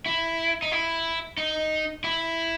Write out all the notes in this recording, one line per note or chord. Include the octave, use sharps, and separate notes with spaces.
E4
D#4
E4
D#4
E4